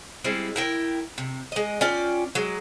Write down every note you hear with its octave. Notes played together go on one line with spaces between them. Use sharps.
G3 G#3 C4 E4
E4 A#4 G5
C3
G#3 D#5
C#4 F4 D5 G5
F#3 G#3